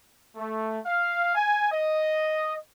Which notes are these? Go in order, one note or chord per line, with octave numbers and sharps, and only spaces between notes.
A3
F5
G#5
D#5